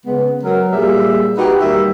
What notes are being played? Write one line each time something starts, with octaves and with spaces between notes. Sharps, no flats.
C#3 G#3 B3
F#3 A#4
A#2 G3 G#4 E5
D#4 F#4 G4 B4
D#2 G3 A#3 E5